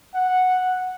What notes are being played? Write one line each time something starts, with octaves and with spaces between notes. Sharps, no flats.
F#5